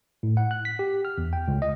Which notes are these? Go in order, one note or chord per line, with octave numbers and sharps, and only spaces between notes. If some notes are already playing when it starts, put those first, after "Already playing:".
A2
F#5
F#6
B6
G4
F6
E2
G5
C#2
D#5